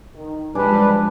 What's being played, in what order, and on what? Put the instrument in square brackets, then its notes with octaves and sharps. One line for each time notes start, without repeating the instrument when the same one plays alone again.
[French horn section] D#3
[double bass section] F3 G#3 [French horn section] G3 [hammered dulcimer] D4 G#5 D6 [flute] B4